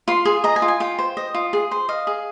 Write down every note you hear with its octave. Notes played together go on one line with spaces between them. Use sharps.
F4 C6
G#4 G#5
D#5 A#5
G#5
F4
G#5
F4 G5
C5
D#5
F4
G#4
C5
D#5 F5
G#4